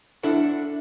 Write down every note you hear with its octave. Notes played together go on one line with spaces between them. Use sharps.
D4 E4 A4 E5 F#5